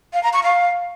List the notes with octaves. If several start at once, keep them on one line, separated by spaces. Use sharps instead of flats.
F5
A#5
C#6
F5